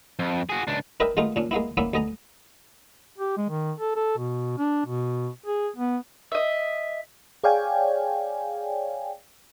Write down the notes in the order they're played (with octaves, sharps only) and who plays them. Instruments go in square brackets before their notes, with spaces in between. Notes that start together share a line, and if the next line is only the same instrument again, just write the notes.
[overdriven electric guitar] F2
F#4 G#4
C#2 D4
[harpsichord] D4 A#4 B4 D#5 E5 G5
D#3 G#3 A3 B3 D#4 F4
A#2 C#4 D4
G#3 A#3 B3 E4
A#3 B3 C#4 E4 D5 E5
D2 B3 D#5 G#5 A#5
[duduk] G4
G#3
D#3
A4
A4
B2
D4
B2
G#4
B3
[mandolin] D#5 E5
[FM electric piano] G#4 C#5 D5 F5 G5 G#5